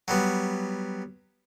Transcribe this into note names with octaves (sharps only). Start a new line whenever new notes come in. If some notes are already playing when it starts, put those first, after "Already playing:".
F#3 G3 B3